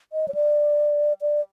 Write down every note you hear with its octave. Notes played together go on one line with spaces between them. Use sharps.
D#5
C#5
D5
D5